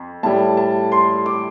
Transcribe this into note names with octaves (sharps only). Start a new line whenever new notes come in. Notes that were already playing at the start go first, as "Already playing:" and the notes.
Already playing: F2
A2 G3 A5
A5
C6
D6